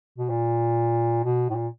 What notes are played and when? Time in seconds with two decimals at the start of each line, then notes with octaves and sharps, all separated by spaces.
0.18 B2
0.29 A#2
1.24 B2
1.50 A2
1.55 A#2